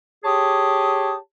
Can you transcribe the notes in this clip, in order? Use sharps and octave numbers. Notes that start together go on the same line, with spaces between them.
G4 G#4 C#5 A5 D#6